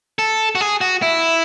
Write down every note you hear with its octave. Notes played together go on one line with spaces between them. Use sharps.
A4
F#4
G#4
F#4
E4